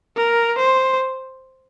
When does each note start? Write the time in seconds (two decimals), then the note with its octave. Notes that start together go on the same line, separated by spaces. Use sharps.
0.16 A#4
0.58 C5